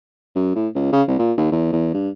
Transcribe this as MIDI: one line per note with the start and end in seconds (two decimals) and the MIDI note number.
0.36 0.52 42
0.55 0.68 45
0.75 0.88 37
0.92 1.02 49
1.08 1.19 36
1.19 1.32 46
1.37 1.49 39
1.52 1.72 40
1.72 1.92 40
1.94 2.09 43